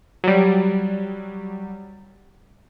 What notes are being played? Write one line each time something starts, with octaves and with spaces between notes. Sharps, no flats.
F#3 G3